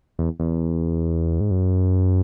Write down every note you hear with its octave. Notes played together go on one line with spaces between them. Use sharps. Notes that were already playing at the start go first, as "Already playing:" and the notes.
E2
E2
G#2
F#2